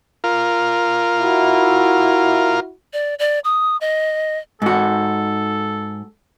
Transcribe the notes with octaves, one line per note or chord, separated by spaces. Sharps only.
F4 A#4
E4 F#4
D5
D5
D#6
D#5
G#2 F#4 A4